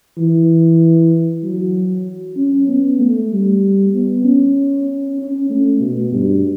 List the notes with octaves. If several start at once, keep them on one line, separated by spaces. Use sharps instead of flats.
E3
F#3
C#4
B3
A3
G3
B3
C#4
C#4
A3
B2
G2